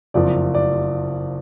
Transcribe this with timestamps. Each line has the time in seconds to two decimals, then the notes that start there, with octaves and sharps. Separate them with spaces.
0.14 F#1 F2 F3 D5
0.54 D5